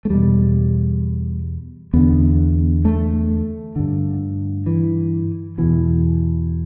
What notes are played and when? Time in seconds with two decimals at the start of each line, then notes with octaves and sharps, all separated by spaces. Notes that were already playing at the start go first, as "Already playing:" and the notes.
0.05 A3
0.10 E2 B2 G3
1.93 E2 D3 B3
2.85 A3
3.76 G2 D3
4.66 E3
5.58 E2 B2 E3